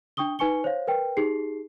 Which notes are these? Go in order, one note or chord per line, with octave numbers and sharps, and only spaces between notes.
D4 G5 C#6 D#6 G7
D#4 B4 G#5 C#6 C#7 G7
C5 C#5 F5
A#4 B4 G5
D#4 G4 G#4 C7